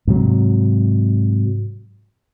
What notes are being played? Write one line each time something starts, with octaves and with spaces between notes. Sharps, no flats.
G#2 C3 F#3